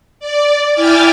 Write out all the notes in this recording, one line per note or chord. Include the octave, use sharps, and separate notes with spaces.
D5
E4 G5 G#5 D6 F6 A6